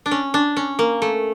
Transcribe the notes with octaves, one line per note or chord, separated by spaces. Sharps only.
D4
C#4
D4
C#4
A#3
A3